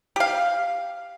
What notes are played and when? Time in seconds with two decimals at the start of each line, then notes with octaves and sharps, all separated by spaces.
0.16 G4 F5